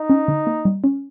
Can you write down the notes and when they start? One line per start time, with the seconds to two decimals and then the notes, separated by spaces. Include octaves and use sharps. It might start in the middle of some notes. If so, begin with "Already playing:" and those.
Already playing: D#4
0.10 C#4
0.28 D3
0.47 A#3
0.65 G3
0.84 C#4